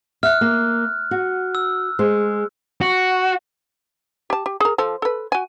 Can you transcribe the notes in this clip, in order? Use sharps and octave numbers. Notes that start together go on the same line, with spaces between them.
E5 F6 F#6
A#3
F#4
E6
G#3 C5
F#4
G4 A5
G4
G#4 A#4
F3 A4
A4 B4
F#4 G#5